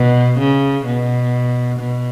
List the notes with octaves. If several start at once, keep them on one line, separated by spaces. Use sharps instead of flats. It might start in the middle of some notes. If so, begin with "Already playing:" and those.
Already playing: B2
C#3
B2
B2